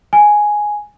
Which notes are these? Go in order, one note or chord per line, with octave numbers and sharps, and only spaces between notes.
G#5